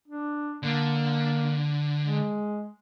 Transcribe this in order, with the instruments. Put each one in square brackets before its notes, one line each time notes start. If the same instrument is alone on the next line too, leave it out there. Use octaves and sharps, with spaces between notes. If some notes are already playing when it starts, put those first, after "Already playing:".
[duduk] D4
[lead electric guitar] D3 [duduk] A#3
[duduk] G#3